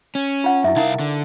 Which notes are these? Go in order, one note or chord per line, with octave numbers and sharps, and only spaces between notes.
C#4
F4 F#5
F#2 E4 E5
C2 D#4 E4 A#4 F5
D3